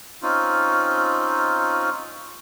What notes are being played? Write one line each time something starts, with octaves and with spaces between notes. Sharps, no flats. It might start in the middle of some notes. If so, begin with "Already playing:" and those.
C4 C#4 D#4 F4